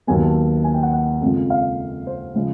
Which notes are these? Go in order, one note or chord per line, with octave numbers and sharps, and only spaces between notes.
D#2 D#3 F#3 B3 G#5
A5
G#5
G5
F#5
F#5
F2 C#3 F3 G#3
F5
C5
C#3 F3 G#3